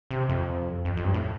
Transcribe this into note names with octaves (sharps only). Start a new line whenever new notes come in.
C3
F2
F2
F2
G2
A2